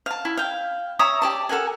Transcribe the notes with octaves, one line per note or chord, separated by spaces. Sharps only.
F5 A5
E4
F5 G5
C#5 E5 A#5 D#6
G4 D5 A5
A4 A#4 F#5 G#5